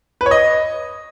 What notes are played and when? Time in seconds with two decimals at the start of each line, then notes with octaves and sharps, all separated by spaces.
0.21 B4
0.26 C#5
0.31 D#5